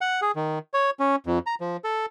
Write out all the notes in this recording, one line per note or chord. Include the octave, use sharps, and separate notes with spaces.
F#5
G#4
D#3
C#5
C#4
F2
A#5
F3
A4